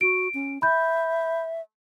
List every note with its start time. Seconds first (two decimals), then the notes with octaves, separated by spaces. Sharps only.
0.01 F#4 D7
0.34 C#4
0.62 E5 B5 G6